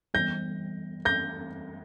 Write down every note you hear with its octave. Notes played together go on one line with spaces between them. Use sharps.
E3 G3 B3 G6 A#6
G6 A#6